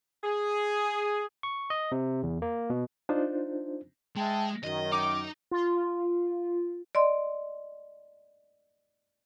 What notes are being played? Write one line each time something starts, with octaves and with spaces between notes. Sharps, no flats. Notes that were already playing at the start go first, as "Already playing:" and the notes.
G#4
C#6
D#5
C3
E2
A#3
B2
D4 D#4 F4 C5
G#3 E5 G5 A5
F#2 D#3 D#5
D#4 D6
F4
D5 D#5 C6